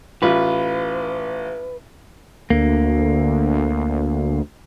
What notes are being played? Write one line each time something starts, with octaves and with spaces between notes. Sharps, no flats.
A1 F4 B4
D2 D3 A#3